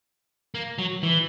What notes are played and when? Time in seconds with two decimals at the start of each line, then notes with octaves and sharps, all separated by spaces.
0.55 A#3
0.79 F#3
1.03 E3